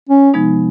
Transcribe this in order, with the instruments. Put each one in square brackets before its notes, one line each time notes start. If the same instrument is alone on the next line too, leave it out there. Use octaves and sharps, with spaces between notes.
[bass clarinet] C#4
[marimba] C3 F3 G#3 B3 D#4